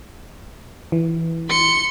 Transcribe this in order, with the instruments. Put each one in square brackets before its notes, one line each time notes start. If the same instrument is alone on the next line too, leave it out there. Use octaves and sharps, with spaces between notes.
[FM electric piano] E3
[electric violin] C6 C#7